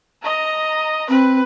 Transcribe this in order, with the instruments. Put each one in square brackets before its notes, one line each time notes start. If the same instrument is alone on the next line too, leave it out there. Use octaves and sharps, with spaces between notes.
[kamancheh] D#5 A#5
[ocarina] C4 [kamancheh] B4